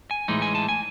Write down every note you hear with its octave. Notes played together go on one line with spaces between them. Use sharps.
G#5
A2 E3 G#3 D#4
G#5
A5
G#5